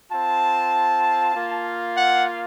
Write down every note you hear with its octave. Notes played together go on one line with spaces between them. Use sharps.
C4 F4 A5
A#3 F4
F#5